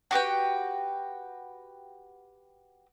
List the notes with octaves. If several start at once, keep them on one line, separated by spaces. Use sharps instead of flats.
F#4 G4 B4 G5